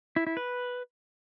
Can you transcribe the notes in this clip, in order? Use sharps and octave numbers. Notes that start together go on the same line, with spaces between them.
E4
E4
B4